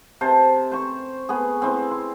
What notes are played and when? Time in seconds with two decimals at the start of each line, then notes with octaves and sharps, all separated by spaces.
0.21 C3 C5 A5
0.72 C5 C#6
1.29 B3 G#4
1.62 C4 E4
1.91 C6